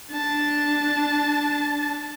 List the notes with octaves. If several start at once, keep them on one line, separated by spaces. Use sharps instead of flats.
D4 A5